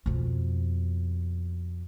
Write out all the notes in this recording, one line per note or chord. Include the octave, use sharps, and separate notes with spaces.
F2 B2